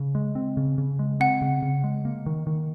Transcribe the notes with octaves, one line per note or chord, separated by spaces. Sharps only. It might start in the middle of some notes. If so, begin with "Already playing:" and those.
Already playing: C#3
G#3
C4
C#3
C#3
G#3
C4 F#5
C#3
C#3
G#3
A#3
D#3
D#3